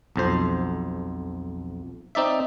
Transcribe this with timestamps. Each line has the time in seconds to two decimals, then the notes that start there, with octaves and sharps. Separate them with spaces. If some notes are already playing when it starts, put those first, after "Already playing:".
0.16 B1 F2 C5
2.15 C4 D#4 D5 E5